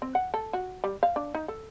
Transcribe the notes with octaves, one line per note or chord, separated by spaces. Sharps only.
C4
F#5
A4
F#4
G3
F5
D4
D#4
A4